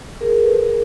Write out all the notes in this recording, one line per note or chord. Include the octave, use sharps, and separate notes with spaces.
G#4 A#4
A4 B4
G#4 A#4